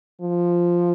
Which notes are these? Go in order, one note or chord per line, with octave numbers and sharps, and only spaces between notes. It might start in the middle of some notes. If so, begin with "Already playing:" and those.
F3